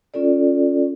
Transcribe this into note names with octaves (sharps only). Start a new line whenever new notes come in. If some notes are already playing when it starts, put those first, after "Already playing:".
C#4 F4 A4 D5